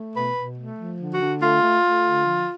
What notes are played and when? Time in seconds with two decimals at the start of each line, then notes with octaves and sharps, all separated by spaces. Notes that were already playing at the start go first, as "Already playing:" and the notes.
Already playing: A3
0.14 B2 B4
0.36 B2
0.56 A3
0.78 F3
0.99 D3
1.12 F#4
1.20 D3
1.41 A3 F4
1.62 A3
1.83 A3
2.04 D3
2.25 F3